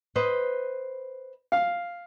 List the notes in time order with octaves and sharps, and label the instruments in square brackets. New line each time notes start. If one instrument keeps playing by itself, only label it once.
[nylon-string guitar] B4 C5 D#5
[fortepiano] F5